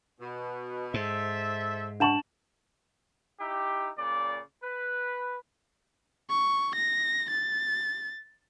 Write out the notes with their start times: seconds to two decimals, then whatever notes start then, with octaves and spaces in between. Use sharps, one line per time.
0.20 B2
0.94 G#2 A4 C5 E5
2.00 D4 F#5 A5 C#6 E7 F#7
3.40 D#4 E4 G4
3.97 A#2 C#3 D5
4.63 B4
6.29 C#6
6.75 A#6
7.30 A6